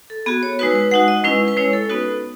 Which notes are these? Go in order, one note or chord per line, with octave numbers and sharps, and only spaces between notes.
A4
B3 F#4 G#4
C#5
G#3 D#4 F#4 B4
B4
G#3 D#4 F#4 F#5
D#5
G#3 C#4 E4 B4
B4
G#3 C#4 E4 C#5
A4
B3 D#4 F#4 B4